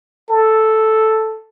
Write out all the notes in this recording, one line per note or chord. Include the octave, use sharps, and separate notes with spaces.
A4